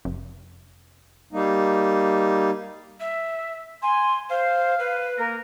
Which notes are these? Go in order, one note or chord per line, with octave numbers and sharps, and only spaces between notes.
F1
G3 A#3 D#4
E5
G#5 C6
C5 F5
B4
A#3 A#4